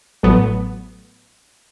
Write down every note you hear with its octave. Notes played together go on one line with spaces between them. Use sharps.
A1 A2 F#3 A3 B3